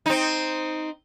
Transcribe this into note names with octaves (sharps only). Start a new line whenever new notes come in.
C4 D#4